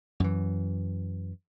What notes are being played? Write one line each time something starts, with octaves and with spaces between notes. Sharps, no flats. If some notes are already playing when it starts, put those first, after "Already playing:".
F#2 E3